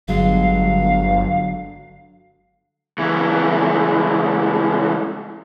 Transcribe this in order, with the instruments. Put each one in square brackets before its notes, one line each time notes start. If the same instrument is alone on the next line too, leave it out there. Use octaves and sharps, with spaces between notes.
[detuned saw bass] G1 [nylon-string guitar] D3 F#3 G#3 [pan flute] F5
[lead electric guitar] C#2 E3